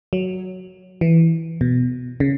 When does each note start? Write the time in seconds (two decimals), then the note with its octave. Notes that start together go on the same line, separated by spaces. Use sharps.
0.13 F#3
1.01 E3
1.61 B2
2.20 C#3